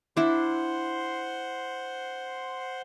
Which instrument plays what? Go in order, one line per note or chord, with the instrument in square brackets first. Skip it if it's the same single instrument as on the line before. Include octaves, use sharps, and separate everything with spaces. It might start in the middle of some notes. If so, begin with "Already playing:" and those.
[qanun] D4 E4 [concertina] C5 F#5 C6